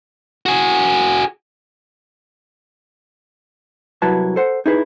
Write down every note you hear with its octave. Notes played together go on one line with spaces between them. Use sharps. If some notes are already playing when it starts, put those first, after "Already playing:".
F#4 G#4
C2 F#3 E4 B4 A5
A4 C5 F#5
D#4 E4 G#4 B4 E5